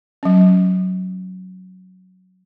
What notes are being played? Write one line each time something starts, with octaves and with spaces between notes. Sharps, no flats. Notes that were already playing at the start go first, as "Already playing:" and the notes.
F#3 C#4